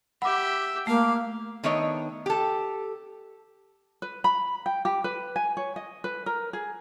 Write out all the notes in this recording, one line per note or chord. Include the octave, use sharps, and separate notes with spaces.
G4 E5 F#5 B5 D6
A3 A#3 F5
D#3 A3 B3 D4 C#5 D#5
G4 A4
B4
B5
G5
G4
B4
G#5
C#5
D#5
B4
A#4
G#4